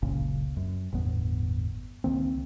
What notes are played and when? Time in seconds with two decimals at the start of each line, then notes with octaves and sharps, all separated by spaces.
0.02 F#1 C#2 A#2 C#3
0.57 F#2
0.92 G1 E2 A2 B3
2.04 C#2 D#3 A#3 C4